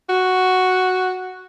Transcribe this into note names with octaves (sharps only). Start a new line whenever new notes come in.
F#4